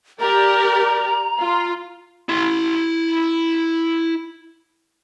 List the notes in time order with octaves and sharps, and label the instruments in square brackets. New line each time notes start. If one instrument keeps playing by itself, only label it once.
[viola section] G4 A#4 D5 [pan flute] A#5
[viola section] F4
[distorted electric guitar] E4 C6